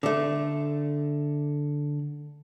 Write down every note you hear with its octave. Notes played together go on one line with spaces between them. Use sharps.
D3 A3